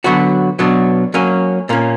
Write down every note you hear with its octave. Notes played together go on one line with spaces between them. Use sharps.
D3 F#3 B3 F#4
B2 F#3 B3 D4
F#3 A#3 C#4
A#2 A#3 C#4